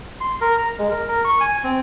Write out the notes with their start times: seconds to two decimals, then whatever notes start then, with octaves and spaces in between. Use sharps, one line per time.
0.21 C6
0.41 A#4
0.58 A#5
0.78 G#3
0.91 A#4
1.08 A#4
1.24 C#6
1.40 G#5
1.64 C4